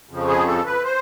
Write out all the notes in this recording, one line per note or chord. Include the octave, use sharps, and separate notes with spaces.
F2 C#3 F3
G#4
A4
B4
C5